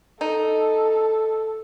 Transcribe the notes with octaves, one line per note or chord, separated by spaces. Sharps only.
D#4 A4